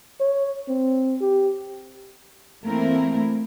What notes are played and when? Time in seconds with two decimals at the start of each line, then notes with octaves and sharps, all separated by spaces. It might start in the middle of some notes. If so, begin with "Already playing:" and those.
0.20 C#5
0.69 C4
1.21 G4
2.64 E3 A3 A#3 C4 E4 A#4